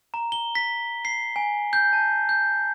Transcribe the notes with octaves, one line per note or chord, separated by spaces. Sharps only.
A#5
G7
B6
C7
G#5
G6
A5
G6